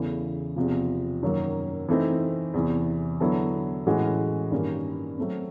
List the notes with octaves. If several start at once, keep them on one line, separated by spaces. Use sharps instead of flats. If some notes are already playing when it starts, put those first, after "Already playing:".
Already playing: E2 C#3 E3 A3
E2 C3 F3
F#2 D#3 F#3 A#3
E3 A3 C4 D#4
E2 C3 E3
D3 F#3 B3 E4 A4
A2 E3 G#3 C#4 F#4
G2 D#3 G3 A#3 C#4
F#3 A3 C4